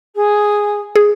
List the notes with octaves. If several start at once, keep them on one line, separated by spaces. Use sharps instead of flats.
G#4
G#4